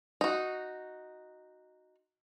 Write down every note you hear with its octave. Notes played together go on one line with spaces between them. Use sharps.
D#4 F#4